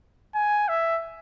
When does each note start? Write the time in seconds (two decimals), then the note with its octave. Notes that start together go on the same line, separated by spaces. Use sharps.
0.35 G#5
0.69 E5